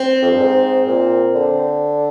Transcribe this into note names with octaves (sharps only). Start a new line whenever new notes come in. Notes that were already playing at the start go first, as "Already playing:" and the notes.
Already playing: C4
F2
G2
G#2
A#2
D3